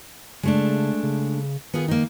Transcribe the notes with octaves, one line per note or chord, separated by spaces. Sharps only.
C#3 G#3 A3 D4
C#3
D#3 B3 F4 G#4
A#3 D#4